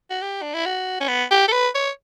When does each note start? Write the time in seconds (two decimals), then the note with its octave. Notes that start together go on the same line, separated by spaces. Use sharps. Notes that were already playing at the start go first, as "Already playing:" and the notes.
0.10 F#4
0.22 G4
0.42 D4
0.54 E4
0.66 F#4
1.01 C#4
1.08 B3
1.31 G4
1.48 A4
1.52 B4
1.75 C#5